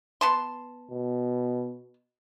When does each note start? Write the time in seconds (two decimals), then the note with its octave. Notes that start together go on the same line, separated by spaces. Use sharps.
0.21 B3 A5 C6
0.90 B2